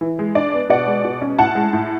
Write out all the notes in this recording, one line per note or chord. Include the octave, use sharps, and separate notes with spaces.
E3
G#3
D4 D5
B3
B2 D5 F#5
G#3
B2
C#4
A2 F#5 A5
G#3
A2